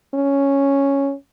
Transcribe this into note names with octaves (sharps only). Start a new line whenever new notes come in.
C#4